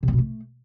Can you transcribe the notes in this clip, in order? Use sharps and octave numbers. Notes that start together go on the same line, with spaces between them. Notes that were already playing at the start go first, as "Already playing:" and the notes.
C3
B3
B2
A3